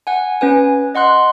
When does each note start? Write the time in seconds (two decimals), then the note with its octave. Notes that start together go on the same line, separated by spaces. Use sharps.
0.07 F#5 G#5
0.41 C#4 B4 G#5
0.95 D#5 F#5 C6 F#6